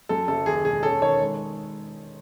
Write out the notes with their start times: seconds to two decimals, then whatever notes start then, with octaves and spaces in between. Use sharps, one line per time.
0.09 F#2 A4
0.28 F#1 A4
0.46 D#2 G#4
0.65 E1 G#4
0.83 C#4 A4
1.01 D#3 C#5
1.20 G#3